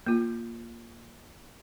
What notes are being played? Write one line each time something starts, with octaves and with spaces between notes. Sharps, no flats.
A#3 F4